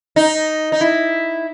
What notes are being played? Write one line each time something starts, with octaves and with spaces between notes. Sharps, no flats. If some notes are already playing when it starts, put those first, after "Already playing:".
D#4
D#4
E4